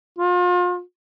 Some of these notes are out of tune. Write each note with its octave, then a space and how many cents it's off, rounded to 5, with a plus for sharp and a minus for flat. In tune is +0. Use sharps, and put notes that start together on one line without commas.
F4 +35